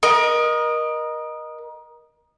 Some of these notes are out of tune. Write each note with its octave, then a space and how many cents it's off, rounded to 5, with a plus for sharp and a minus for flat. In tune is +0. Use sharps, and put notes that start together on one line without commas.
A#4 +30 D#5 -10